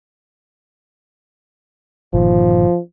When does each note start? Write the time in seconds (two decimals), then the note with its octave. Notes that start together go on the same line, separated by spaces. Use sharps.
2.14 G1 A#2 D#3 F3